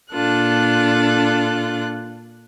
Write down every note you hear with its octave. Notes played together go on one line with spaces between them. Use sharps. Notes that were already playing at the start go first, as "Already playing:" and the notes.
A#2 D4 F4 A4 F#6